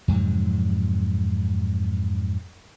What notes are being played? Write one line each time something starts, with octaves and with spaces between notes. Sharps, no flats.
F2 G#2 C3 F#3